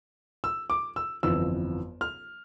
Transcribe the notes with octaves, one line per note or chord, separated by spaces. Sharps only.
E6
D6
E6
G1 F2 E3 E6
F6